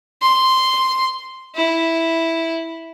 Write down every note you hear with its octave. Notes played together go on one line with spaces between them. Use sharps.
C6
E4